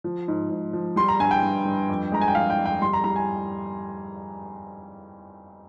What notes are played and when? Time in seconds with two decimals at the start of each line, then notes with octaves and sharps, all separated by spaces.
0.04 F3
0.28 G#2
0.51 G#2
0.73 F3
0.96 G3 C6
1.08 A#5
1.20 G2 G#5
1.31 G5
1.43 G2
1.65 G2
1.90 F2
2.12 G#3 A#5
2.21 G#5
2.28 G5
2.35 F2 F5
2.50 G5
2.59 F2
2.65 G5
2.82 G3 C6
2.93 A#5
3.04 G3 A#5
3.16 G#5